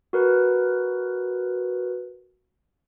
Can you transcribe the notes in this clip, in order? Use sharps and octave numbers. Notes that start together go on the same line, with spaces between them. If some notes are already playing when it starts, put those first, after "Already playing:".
F#4 A#4 B4